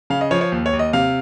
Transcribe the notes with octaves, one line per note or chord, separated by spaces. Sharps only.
C#3 F5
D#5
F3 C#5
C#5
D#2
C#5
D#2
D#5
C3 F5